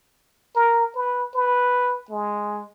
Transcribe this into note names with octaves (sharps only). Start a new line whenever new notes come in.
A#4
B4
B4
G#3